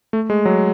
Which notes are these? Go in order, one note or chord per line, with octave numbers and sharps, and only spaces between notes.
A3
G#3
F#3